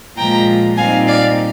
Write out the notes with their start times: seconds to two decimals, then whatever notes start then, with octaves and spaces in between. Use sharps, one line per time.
0.18 A#2 F3 G#3 G5 A#5
0.77 A#2 G3 C4 D#4 F5 G#5
1.07 D5 F5